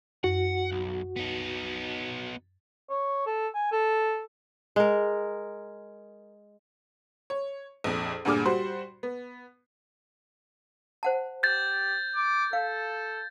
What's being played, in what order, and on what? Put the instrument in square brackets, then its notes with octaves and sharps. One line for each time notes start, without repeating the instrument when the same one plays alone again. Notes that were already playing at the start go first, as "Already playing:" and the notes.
[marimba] F#2 [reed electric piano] F#4 [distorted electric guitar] F#5
[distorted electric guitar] B1
B3 D#4
[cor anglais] C#5
A4
G#5
A4
[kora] G#3 A#4
[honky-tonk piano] C#5
A#1 F2
D2 G2 A#2 G#4 D6 F6
G3 F#4 C5 C6
B3
[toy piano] C5 F#5 A5
[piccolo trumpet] G4 [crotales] G6 A6
[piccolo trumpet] D6
[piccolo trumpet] A4 [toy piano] F5